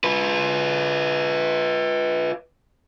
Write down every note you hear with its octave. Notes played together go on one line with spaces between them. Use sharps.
F4 B4